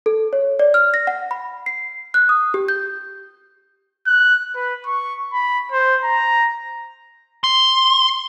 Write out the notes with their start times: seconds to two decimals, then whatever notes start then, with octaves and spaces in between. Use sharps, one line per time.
0.06 A4
0.33 C#5
0.59 D5
0.74 F6
0.94 A#6
1.07 F#5
1.31 B5
1.66 C7
2.14 F#6
2.29 D#6
2.54 G4
2.68 G6
4.06 F#6
4.55 B4
4.86 C#6
5.33 B5
5.72 C5
6.04 A#5
7.44 C6